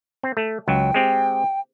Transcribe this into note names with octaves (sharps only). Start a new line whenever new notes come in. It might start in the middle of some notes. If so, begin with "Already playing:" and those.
C4
A3
C#2 F#3 G5
G#3 C4 G4